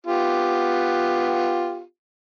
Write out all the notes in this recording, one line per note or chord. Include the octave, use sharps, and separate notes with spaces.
B3 F4 G4